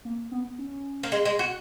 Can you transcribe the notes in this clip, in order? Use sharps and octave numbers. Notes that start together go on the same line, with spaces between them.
A#3
B3
C#4
A#3
G#3
G#3
F#4